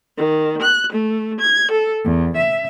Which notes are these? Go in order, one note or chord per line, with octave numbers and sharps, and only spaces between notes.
D#3
F#6
A3
G#6
A4
E2
E5